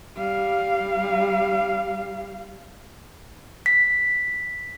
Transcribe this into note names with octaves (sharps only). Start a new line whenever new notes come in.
G3 F5
B6